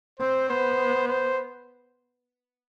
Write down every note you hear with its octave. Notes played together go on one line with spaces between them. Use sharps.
C4 C5
B3 C5
C5